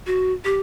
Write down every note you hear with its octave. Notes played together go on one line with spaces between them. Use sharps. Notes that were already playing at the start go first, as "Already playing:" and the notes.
F#4
G4